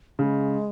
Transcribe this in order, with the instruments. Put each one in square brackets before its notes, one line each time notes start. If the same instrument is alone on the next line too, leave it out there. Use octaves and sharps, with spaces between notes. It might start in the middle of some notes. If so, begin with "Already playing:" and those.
[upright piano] C#3 [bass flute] G#3